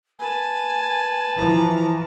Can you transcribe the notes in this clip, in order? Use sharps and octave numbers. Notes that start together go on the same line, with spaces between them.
B4 G#5 A5
E3 F3 A#5